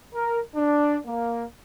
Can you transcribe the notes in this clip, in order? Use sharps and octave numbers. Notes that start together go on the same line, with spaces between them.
A#4
D4
A#3